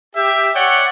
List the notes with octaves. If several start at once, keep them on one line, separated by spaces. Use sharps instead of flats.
G4 E5
C#5 D5 F#5 G5